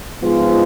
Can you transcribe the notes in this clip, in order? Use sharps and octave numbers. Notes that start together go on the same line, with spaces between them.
G#2 F3 G#3 B3 F4